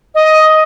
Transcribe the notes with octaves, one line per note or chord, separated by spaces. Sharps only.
D#5